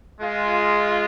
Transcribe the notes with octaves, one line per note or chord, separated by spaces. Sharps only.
G#3 F4